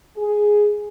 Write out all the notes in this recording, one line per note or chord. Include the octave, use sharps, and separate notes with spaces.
G#4